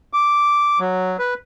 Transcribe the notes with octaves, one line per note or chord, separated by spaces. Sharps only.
D6
F#3
B4